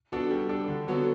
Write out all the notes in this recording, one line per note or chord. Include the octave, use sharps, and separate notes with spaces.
B3 D4 F#4 A4
G3
D4 A4
D3
F#3 B3 F#4 A4